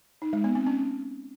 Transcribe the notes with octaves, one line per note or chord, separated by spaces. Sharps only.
D#4
G#3
B3
C4
C#4